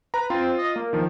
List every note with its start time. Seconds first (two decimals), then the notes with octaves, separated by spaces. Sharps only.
0.14 B4 A#5
0.30 C4 F4
0.58 D#5
0.76 A#3
0.93 D#3 F3